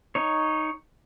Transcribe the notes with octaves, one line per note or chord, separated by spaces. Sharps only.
D#4 C#5